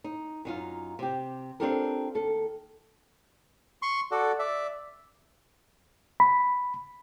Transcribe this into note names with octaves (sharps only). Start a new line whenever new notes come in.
D#4
F#2 D#4 F4
C3 G4
C4 D4 F4 G4 A4 A#4
D#2 A4
C6 C#6
F#4 A4 D5
D5 E5
B5